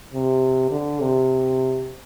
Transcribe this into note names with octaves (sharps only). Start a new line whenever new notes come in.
C3
D3
C3